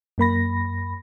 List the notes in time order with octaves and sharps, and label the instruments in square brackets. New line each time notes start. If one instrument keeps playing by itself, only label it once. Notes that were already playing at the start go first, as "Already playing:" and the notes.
[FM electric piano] F#2 A#3 B5 A#6